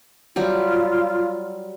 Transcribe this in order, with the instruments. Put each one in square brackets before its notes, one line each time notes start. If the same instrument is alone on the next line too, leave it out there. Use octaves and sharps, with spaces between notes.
[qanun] F#3 G3 G4 [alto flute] F4